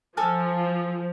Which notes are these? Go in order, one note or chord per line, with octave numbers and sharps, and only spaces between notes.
F3 A4 G#5 F6